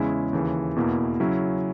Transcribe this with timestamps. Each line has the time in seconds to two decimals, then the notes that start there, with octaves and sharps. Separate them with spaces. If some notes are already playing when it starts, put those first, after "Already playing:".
Already playing: E2 C#3 G#3 C#4 E4
0.33 D#2 C#3 E3
0.76 E2 B2 A#3 E4
1.20 C#3 F#3 C#4 E4